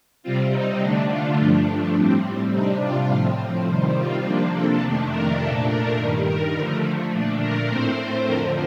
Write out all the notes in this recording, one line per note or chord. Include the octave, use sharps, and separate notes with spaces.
C3 G3 C4 F4
D#4
D3 A3 D4
F4
G2 F3 A3 D4
D4
A2 G3 C4
C3 G3 D4 D#4
F4
A2 F3 C4
C3 D#3 G3 C4
F4
C3 F3 A#3 D4
A4
F2 C3 D#3 A3 D4
A#4
A#2 A3 D4 A4
A#4
G2 D#3 G3
A#4
D3 F3 A3
A#2 A3 D4
A#4
A2 A3 C4 C5
F2 D3 F3 A#4